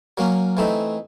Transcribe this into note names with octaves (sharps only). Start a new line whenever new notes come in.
F#3 A#3 C#4
E3 A3 C4 D#4